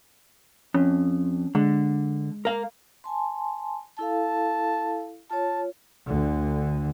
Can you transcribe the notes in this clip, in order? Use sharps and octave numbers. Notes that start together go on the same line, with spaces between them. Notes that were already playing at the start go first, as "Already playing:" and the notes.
F2 C#4
D3 G#3
A#4 F5
G#5 A5 C6
E4 A4 F5 A5
F4 C#5 A5
D2 D3